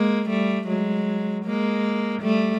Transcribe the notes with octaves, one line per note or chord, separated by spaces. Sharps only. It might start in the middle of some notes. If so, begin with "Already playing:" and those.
Already playing: G#3 A#3
G3 A3
F#3 G#3
G#3 A#3
G3 A3